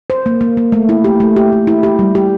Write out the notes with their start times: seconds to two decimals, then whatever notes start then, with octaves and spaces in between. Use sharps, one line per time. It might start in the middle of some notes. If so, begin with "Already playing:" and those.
0.10 C5
0.26 A#3
0.41 A#3
0.57 A#3
0.72 A3
0.89 E4
1.04 G4
1.20 A3
1.36 G4
1.53 A3
1.67 E4
1.83 G4
1.99 G3
2.15 G4